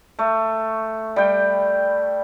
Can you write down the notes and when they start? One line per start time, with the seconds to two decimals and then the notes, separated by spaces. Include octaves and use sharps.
0.19 A3
1.16 G3 G5